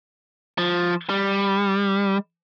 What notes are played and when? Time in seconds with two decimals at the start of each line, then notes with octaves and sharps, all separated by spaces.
0.58 F3
1.09 G3